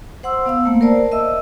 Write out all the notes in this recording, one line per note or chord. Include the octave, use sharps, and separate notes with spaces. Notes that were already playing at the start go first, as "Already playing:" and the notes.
C5 F#5 C6 E6
B3 F5 E6
A3 A#3
A#4 C5 D5 A5
A#4
D#5 E5 E6